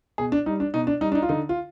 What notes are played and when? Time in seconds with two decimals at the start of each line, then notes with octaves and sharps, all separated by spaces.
0.18 B2 G#4
0.32 D4
0.46 G3 D#4
0.60 D4
0.74 B2 D#4
0.87 D4
1.01 G3 D#4
1.12 D4
1.15 D#4
1.22 F4
1.29 D3 D#4
1.49 F4